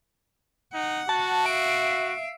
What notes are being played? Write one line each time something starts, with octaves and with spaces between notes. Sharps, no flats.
D#4 F#5
F#4 A5
E5 F5 D7